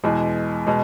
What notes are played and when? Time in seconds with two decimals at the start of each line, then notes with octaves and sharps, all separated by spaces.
0.04 E2 B2 G#3
0.67 B2 G#3